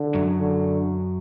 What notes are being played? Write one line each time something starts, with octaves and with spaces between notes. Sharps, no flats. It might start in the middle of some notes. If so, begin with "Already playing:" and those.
Already playing: D3
F#2 F#3
D3